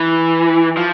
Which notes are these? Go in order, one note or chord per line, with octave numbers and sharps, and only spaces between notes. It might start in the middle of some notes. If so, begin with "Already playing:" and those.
Already playing: E3
F3